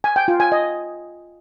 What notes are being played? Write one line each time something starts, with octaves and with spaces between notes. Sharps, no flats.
G#5
G5
F4
G#5
D#5